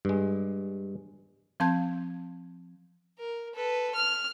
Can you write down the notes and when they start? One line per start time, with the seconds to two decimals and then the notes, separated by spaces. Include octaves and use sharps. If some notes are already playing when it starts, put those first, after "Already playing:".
0.05 G2 G#3
1.60 F3 C4 F5 A5 G6 G#6
3.19 A#4
3.54 A4 B4
3.94 F6